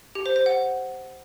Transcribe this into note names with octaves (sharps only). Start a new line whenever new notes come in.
G4
C5
C5
F#5